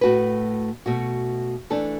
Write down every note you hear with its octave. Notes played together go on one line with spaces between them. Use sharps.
A2 A3 F#4 B4
B2 A3 F#4
E3 A3 D4 A4